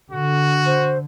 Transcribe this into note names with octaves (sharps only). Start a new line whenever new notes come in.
D3 F#4
C5